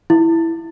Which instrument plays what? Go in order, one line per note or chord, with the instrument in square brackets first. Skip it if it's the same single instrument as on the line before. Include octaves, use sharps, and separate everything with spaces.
[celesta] E4